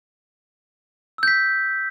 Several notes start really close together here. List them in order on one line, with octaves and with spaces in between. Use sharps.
E6 G6 B6